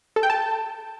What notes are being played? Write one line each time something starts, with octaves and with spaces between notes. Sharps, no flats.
A4
G5
A5